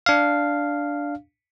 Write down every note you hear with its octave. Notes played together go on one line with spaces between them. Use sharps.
D4 F5